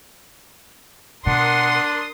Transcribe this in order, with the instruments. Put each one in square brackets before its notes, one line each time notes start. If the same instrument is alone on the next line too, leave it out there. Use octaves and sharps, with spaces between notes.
[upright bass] B2 [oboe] D4 [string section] A#4 C6 D#6 [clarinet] F#5